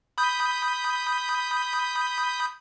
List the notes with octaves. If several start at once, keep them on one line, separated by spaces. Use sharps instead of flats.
B5 D#6 G6